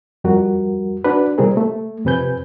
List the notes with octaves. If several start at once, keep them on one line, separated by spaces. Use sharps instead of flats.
F2 G3 F#4 A#4
D4 F#4 B4
C3 G3 C4 G#4 A#4
A3
F2 C3 B4 G#5 G6